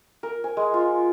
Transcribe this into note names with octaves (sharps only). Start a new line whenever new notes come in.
A#4
G#5
G#3
F4